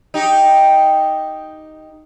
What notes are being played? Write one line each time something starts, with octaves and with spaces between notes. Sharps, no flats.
D#4 G4